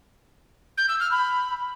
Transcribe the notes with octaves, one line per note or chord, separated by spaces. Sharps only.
G6
E6
F6
B5